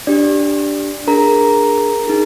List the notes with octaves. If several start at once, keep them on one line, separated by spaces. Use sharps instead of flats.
D4 G4 D5
D4 G#4 A#4 A#5
D#4 G#4